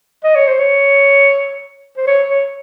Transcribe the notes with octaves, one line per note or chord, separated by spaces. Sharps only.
D#5
C#5
C5
C#5
C5
C#5
C#5